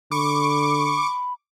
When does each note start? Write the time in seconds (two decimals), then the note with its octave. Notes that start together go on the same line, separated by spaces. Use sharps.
0.11 D3 B5 C#6 D6